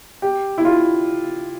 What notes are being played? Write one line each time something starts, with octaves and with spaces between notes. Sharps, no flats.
G4
E4
F4